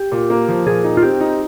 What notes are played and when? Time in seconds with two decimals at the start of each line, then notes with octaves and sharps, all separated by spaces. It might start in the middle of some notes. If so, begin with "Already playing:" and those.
Already playing: G4
0.12 A#2
0.30 A#3
0.49 F3
0.66 A#2 G#4
0.84 D#4
0.97 F4
1.02 C4 G4
1.21 D#4